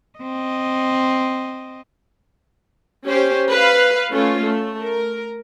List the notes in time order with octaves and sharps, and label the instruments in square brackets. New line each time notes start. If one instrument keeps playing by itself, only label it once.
[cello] C4 D#5
[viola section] C#4 G4 C5
B4 F5
A3 C#4 F4
A3
A#4